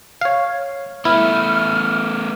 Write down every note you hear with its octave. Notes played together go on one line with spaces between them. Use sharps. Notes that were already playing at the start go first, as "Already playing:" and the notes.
C#5 F5
A3 B3 E4 F6